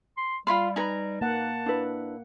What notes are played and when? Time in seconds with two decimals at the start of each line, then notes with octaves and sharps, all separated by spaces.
0.17 C6
0.47 G3 F4 B5 C6
0.76 D#4 B4 G#5 A#5 B5
1.21 A#3 F#5 A5
1.66 D4 E4 B4